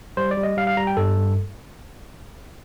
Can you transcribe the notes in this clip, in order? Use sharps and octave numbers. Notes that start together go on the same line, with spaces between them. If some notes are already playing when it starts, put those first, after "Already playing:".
G3 C5
D5
G3
D#5
G3 F5
F5
G3 A#5
G5
G2 A4
G3